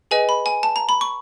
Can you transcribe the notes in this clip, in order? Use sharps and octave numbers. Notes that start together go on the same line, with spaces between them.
G#4 B4 D#5 G#5
B5
G#5
A5
A#5
B5
C#6